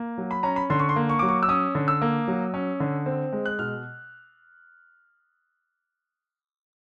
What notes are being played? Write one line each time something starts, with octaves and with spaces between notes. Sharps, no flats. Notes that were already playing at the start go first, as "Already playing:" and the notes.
Already playing: A#3
F#3
B5
C#4 A#5
B5
D3 C6
C#6
C6
A#3
C#6
F#3 D6
C#6
E6
C#4 D#6
D3
E6
A#3
F#3
C#4
D3
C4
G#3
F#6
B2 F6